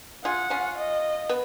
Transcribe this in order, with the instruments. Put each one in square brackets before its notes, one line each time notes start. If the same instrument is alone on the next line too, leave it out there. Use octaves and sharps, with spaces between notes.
[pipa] F4 G#4 [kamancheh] F#5
[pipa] C#4 F4
[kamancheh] D#5
[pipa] B3